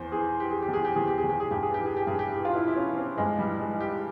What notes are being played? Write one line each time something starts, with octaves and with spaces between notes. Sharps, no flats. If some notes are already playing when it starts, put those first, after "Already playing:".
Already playing: E2 C5
E3 G#4
E3 G4
G#4
G4
E2
G#4
G4
E2 G#4
G4
G#4
E2
G4
G#4
G2 G4
G#4
E3 G4
G#4
G4
G2 G#4
G4
E3 G4
F4
E4
E3
E4
C#4
E3
C4
G2 G#3
G3
E3
G#3
E3
G4